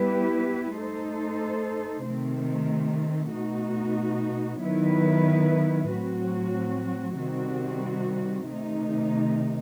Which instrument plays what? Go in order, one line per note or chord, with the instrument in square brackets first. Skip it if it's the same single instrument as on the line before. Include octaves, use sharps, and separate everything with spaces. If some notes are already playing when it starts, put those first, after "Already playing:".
Already playing: [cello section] G3 B3 E4 G4 B4
A3 D#4 A4 C5
C3 D#3 A3 C4
B2 A3 D#4 F#4
D#3 F#3 B3 E4 B4
A2 F#3 C4 F#4
C3 D#3 G3 C4 F#4
C3 D#3 A3 D#4